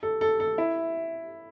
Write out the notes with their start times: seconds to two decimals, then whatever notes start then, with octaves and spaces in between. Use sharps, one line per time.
0.03 A4
0.21 A4
0.40 A4
0.58 E4